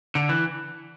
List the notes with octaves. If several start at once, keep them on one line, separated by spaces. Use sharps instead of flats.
D3
E3